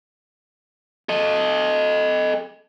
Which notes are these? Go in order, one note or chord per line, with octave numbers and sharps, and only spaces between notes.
A4 D#5